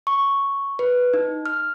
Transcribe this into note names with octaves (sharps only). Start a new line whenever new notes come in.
C#6
B4
D#4
F6